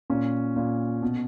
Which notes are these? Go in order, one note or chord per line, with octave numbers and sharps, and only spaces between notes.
A#2 C#4
A#2
B2